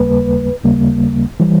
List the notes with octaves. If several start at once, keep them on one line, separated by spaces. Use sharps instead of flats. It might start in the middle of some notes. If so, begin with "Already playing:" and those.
Already playing: D#2 C#3 G3 A#3 B4
D#2 C#3 G3 A#3
E3 G3